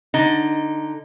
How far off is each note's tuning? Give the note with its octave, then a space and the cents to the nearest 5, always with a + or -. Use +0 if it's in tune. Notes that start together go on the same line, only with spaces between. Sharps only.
D3 +10 D#4 +0